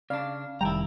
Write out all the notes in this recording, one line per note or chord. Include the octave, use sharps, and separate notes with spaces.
C#3 D4 D5 F5
F1 D#3 G3 E4 G5 A5 A#5